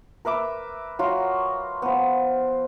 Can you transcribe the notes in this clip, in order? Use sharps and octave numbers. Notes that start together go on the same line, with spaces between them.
A#4 B4 E5 D6
F#3 F4 F#4
F3 B3